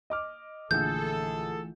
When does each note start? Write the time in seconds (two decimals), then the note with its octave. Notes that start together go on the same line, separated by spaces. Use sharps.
0.10 D#5 D6 F6
0.71 A#1 D3 E3 A3 G#4 A4 G6